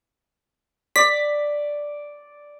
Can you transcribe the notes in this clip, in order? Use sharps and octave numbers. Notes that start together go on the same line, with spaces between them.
D5 B6